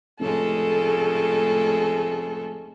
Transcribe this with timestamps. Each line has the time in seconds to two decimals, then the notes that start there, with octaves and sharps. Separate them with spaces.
0.20 F1 A2 C#3 G#3 A4